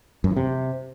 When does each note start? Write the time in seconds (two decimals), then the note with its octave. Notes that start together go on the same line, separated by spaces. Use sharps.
0.24 F#2
0.30 E3
0.36 C3